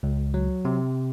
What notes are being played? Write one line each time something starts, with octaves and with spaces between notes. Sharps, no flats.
C#2
F#3
C3